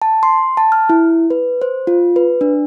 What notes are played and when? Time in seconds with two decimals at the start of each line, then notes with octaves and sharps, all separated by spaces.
0.02 A5
0.23 C6
0.57 A5
0.72 F6
0.90 E4
1.30 B4
1.62 C5
1.87 F4
2.16 B4
2.41 D4